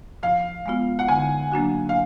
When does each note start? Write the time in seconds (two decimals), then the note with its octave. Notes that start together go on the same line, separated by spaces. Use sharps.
0.23 F3 F5
0.66 G#3 B3 F4
0.99 F#5
1.08 D3 G#5
1.52 F#3 A#3 D4 F#4
1.89 F5